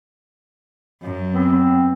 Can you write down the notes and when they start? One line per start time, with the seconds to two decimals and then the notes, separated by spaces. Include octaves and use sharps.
1.02 F#2
1.34 B3 C4